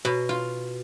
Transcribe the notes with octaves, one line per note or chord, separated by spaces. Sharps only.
B2
F4